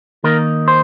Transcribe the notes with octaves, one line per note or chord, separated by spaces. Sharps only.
D#3 A#3 D#4 A#4
C5